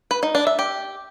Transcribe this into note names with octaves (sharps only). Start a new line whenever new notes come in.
B4
D#4
D4
E5
G4